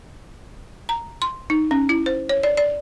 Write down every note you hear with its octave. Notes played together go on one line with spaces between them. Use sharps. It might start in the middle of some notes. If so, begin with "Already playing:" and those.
A#5
C6
D#4
C#4
E4
C5
C#5
D5
D5